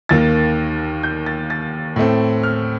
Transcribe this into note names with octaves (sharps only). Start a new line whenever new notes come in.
D#2 D#3 A#3 A6
G6
A6
A6
A2 A3 C4
F6